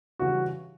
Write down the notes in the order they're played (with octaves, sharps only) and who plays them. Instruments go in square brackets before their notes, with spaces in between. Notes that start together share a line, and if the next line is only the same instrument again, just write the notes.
[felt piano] C#3 E3 G3 [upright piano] F#4